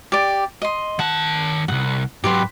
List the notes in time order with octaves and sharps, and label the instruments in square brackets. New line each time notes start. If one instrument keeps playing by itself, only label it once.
[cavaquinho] G4 D5
D#5 C6
[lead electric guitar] D#3 A5 [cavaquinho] F#5
[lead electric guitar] C2 F#2 [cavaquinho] F#5
[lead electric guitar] G#2 F#3 [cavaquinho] G4 B4 C6